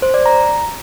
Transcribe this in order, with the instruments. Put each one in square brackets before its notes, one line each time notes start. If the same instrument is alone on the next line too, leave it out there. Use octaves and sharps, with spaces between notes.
[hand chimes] C5
D5
A#5